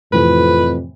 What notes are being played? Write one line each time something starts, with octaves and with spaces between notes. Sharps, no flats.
F2 A2 C3 E3 B4